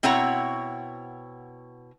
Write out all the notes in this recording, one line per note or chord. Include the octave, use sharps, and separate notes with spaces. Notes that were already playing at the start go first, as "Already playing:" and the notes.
B2 C4 E4 C#5 F#5 A#5